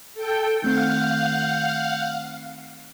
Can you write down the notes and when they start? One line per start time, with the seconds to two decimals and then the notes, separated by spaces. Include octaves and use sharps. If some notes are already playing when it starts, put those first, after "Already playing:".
0.14 A4 G5
0.62 D#3 A3 C4 F5 F#5 G6